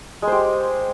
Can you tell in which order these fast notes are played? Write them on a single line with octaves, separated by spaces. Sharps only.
G#3 C5 G4